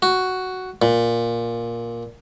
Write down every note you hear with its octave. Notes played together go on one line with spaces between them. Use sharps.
F#4
A#2